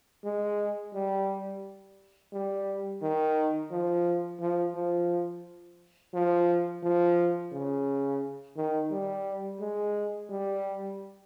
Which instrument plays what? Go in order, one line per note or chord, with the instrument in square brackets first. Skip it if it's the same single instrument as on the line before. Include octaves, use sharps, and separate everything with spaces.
[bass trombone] G#3
G3
G3
D#3
F3
F3
F3
F3
F3
C#3
D#3
G3
G#3
G3